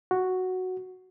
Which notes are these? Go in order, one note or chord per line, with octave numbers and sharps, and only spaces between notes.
F#4